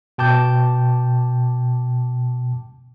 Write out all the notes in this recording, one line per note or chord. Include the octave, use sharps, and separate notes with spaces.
B2 G5 A5 D6 G6